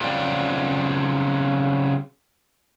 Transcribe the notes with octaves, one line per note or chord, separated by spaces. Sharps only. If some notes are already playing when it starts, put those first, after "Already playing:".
C#3 F#3 C4 F4 D5 G5